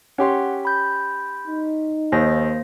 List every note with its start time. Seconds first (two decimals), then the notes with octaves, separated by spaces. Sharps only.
0.18 C#4 G4 F#5 C6
0.65 B5 G6
1.48 D#4
2.12 D#2 A#3 C5 A#6